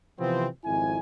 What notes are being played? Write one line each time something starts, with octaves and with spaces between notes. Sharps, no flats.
C3 E3 F3 B3 C4
G#1 F2 E4 G#5